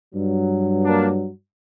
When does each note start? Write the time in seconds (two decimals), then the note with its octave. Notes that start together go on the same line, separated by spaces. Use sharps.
0.15 G2 F#3
0.84 A#3 D4